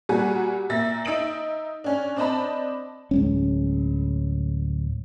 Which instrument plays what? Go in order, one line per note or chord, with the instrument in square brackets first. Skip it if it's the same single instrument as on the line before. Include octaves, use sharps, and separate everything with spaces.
[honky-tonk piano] A#2 G3 F#4 G#5
A#2 E5 A6 A#6
D#4 E5 D#6 D7 F#7
C#4 D4
C4 D4 D5 D#5 A5 B5
[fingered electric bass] D1 G#3 C#4